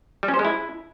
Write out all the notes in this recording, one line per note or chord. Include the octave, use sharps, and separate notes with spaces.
G3
C#4
C5
G#3
E4